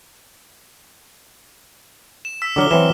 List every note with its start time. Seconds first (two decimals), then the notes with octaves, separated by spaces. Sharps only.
2.25 E7
2.42 E6 B6
2.56 D3 F#3 D6 F6 G7
2.71 E3 F#3 C4 E7